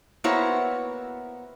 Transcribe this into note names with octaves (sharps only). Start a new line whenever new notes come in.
A#3 B3 E4 F#4 C5 C#5